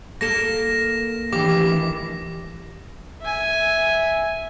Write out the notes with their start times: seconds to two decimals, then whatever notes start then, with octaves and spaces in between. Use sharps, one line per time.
0.21 A#3 A4 A#6 E7
1.33 D2 D#3 E3 G4 F5 D6
3.22 E5 G#5